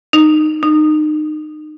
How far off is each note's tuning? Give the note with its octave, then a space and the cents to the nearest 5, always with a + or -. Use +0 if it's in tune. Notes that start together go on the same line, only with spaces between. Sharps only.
D#4 -15
D#4 -30